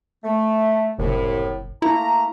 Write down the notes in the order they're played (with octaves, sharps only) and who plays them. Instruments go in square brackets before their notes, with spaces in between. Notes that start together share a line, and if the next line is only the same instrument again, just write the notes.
[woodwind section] A3
[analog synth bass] F#1 [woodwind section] C2 A2
[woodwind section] A3 A#3 A#5 [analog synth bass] E4